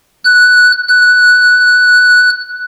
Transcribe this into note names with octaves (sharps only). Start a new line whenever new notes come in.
F#6
F#6